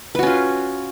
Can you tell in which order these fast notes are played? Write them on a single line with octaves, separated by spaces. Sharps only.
B4 F#4 C#4 F4